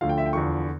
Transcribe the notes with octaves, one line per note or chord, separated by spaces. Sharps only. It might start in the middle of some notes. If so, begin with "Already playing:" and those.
D2 D3 F3 F5
G5
E5
G5
E2 D3 F3 C#6